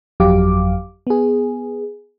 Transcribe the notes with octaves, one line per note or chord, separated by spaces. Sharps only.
G1 F2 F#3 G4 F5 D6
B3 G#4